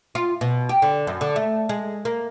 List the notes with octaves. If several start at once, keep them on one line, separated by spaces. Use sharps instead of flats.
F4
B2
G4
D3
F#2
D3
A3
G#3
A#3